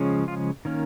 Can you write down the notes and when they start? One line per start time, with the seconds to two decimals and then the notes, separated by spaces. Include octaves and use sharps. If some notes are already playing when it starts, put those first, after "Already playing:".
Already playing: C#3 F3 G#3 C#4
0.28 F4
0.65 D#3 A#3 C#4